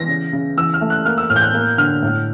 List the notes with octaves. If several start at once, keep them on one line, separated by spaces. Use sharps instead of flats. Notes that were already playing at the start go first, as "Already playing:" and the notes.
Already playing: E3 A#6
C#3
C#3
E3 E6
F6
A3
F#6
A#3 F6
E6
A2 F6
G6
F#6
A#3
D3 F6
A2